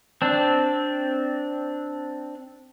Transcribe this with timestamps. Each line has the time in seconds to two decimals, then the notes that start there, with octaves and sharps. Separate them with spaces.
0.22 C4 D4